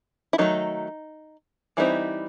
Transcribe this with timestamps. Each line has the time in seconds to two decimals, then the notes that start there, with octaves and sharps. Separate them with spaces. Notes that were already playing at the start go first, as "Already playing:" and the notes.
0.33 E4
0.38 D#3 F#3 A3 D#4
1.77 E3 G3 C4 D#4 E4